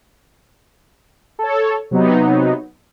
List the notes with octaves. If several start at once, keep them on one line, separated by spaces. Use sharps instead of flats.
A4 C#5
C3 F#3 B3 D#4